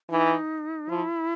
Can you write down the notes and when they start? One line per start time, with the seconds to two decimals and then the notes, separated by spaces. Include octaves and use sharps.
0.10 E3 D#4
0.89 F3 E4